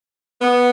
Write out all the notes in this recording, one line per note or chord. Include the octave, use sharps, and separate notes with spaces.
B3